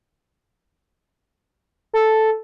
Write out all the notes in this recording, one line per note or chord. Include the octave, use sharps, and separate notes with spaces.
A4